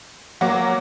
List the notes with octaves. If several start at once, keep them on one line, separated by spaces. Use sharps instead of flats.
F#3 A#3 F#5 D6